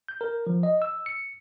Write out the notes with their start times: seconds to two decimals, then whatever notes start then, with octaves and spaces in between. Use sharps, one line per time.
0.08 G6
0.21 A#4
0.47 F3
0.63 D#5
0.82 E6
1.06 C#7